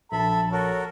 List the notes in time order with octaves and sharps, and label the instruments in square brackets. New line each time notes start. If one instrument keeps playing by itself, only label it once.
[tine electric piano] A#1 [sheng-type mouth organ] A4 E5 B5 [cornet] A5
[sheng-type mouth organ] F#4 A4 A#4 [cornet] C#5